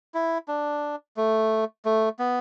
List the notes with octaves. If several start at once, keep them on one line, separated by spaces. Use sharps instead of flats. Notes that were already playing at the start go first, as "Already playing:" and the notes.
E4
D4
A3
A3
B3